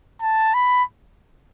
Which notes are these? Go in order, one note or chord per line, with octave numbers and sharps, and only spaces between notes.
A5
B5